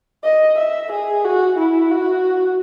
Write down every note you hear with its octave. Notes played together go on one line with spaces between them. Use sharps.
D#5
E5
G#4
F#4
E4
F#4